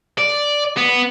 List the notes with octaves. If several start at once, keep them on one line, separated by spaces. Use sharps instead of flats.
D5
B3